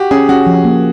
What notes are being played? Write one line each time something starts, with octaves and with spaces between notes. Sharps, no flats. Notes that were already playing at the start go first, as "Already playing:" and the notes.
Already playing: F#4 G4
C#4 G#4
C#4 F#4
F3
A#3